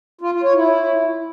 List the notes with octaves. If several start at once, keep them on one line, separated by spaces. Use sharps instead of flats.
F4
F4
C#5
E4